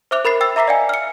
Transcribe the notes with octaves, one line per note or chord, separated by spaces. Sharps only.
C5 E5 D6 F#6 F7
A#4 B5 A6 C7
G5 E6 A6
E5 A#5 D6 B6 C7
D5 D#5 F5 G5 G#5
F6 C#7